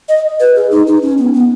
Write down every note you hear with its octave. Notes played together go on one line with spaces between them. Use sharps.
D#5
B4
G#4
D#4
D#4
C#4
B3
B3